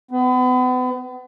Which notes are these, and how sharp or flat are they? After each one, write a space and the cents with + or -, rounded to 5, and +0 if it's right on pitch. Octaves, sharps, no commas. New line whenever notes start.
B3 +35